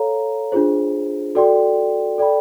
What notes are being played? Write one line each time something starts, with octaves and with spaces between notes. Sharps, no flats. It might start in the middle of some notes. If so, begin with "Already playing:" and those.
Already playing: A4 C#5 F5 A#5
D4 F4 G#4 C5
F#4 A4 D5 G5 C6
A4 D5 G5 B5